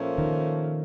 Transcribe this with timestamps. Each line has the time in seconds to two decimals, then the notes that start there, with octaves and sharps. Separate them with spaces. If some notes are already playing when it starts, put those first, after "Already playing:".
Already playing: A#2 F3 A3 C#4
0.18 D#3